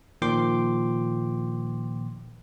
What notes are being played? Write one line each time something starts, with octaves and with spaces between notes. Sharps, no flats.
A#2 D#3 F3 G5 C6 D6